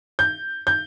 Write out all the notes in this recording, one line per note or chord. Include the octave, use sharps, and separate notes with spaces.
G6
G6